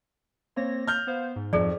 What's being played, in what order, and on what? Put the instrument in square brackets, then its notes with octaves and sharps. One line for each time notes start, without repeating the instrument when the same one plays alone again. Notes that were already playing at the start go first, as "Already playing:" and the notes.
[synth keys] A#3 C#5 A#6 [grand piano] C4
[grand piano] F6 G6
[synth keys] B3 C5 F5
G#2
[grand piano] F2 [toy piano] G#4 D5